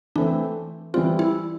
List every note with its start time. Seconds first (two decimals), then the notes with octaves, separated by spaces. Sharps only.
0.16 E3 A3 C4 D4
0.94 E3 G3 C4 F4
1.19 E4